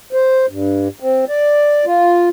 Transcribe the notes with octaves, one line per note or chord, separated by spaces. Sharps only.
C5
G2
C4
D5
F4